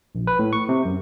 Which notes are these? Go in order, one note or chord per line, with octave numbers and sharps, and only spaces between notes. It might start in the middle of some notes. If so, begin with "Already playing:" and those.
A#1
B4
A2
C#6
C3
F#2